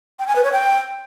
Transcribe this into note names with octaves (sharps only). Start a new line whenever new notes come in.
G5
G#5
B4
C#5
G5